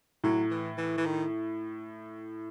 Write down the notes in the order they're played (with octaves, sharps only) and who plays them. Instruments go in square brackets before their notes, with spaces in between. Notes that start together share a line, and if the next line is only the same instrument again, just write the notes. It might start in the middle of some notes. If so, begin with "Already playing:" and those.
[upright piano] A2 [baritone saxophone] F#3
[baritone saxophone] E3
E3
E3
D#3